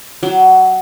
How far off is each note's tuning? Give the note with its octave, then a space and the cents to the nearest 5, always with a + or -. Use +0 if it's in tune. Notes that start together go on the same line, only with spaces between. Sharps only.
F#3 +15